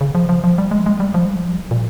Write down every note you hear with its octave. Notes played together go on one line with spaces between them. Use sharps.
C#3
F3
F3
F3
G3
G#3
G#3
G3
F3
G3
F3
A#2